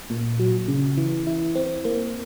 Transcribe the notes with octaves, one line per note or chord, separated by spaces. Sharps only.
A#2
F#3
C#3
E3
E4
C4
A#3